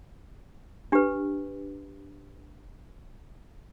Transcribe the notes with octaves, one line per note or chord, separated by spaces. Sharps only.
D4 G4 B4